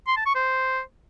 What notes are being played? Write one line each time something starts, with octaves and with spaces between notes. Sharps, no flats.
C6
A5
C#6
C5